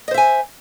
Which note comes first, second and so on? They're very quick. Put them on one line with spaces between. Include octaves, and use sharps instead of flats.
D#5 C5 E5 G#5